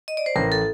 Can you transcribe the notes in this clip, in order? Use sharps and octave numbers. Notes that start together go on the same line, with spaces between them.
D#5
D5
C5
A1 A#4
A4